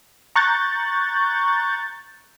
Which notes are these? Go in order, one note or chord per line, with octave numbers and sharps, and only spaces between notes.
A#5 C#6 F#6 G6 A6